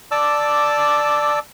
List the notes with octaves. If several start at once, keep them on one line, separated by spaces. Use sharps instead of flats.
D5 A5 D6 E6